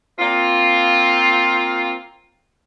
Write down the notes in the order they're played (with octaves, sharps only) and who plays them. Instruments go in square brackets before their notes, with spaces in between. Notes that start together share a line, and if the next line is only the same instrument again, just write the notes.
[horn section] A#3 C4 F4